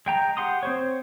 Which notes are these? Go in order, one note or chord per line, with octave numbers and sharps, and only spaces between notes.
G#3 G5 A#5
G4 F#5 C6 D#6
C4 C5 C#5